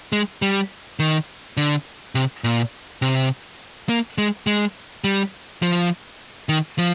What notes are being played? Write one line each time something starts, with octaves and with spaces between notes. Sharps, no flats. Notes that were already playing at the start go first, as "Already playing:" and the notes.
G#3
G3
D#3
D3
C3
A#2
C3
A#3
G#3
G#3
G3
F3
D#3
F3